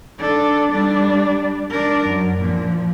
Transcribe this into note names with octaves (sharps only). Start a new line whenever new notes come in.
D4 A4
G3 D4
D4 A#4
F#2
A#2 F3